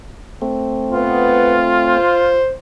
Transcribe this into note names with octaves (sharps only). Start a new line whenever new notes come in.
A3 C4
B3 F4
C5